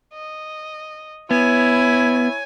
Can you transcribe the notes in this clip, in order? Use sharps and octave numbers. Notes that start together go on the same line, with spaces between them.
D#5
B3 E4 C#5 G#5